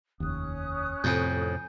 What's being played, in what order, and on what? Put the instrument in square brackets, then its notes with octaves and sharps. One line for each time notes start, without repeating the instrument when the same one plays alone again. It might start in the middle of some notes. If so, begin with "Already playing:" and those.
[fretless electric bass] F1 D#2 [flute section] C#4 D#6 F#6
[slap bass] F2 A2 [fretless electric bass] C3 [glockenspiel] G#5 G6